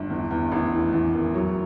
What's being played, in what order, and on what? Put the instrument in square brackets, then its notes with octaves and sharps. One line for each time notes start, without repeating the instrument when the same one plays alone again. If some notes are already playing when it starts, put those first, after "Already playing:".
Already playing: [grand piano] G1 D4
E2
E2
A1
E3
E2
F#1
F#3